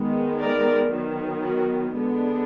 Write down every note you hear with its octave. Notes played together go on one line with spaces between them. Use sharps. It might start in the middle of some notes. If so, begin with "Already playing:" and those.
Already playing: D#3 G#3 B3
A#4 D5
D#3 F#3 B3
F#4 A#4
D3 G#3 B3 D4